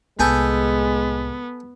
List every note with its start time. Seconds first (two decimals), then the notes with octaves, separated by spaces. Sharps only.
0.19 C2 A2 G#3 B3 A4 G5 G#5